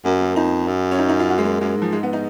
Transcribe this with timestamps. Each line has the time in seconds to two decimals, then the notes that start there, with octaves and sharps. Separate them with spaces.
0.04 F#2 A#3
0.21 A#3
0.36 F2 D#4
0.67 F#2
0.92 C#4
0.98 D#4
1.09 D#4
1.20 F4
1.30 F#4
1.38 G#3
1.45 A#3
1.60 F#2 G#3
1.77 G#2
1.82 F3
1.93 G#3
2.03 B3
2.13 D#4